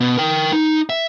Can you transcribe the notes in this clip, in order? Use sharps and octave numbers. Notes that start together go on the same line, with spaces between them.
B2
A#4 G5
D#4
E5